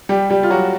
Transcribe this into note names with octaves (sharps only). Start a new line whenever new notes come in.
G3 G4
G3 G4
F4
F#3 F#4